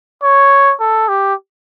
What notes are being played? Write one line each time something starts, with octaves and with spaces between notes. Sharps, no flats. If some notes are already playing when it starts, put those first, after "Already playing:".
C#5
A4
G4